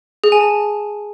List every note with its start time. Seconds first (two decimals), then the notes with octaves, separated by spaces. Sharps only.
0.24 G#4
0.32 G#5
0.41 A5